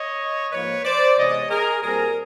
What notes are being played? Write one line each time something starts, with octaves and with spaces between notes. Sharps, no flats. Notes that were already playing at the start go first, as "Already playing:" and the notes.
Already playing: C#5 D#5
G#2 F3 A#3 B4 C#5
C5 D5
C3 E3 G#3 B3 C#5 D#5
G#4 A#4
A#2 G3 C4 G#4 A#4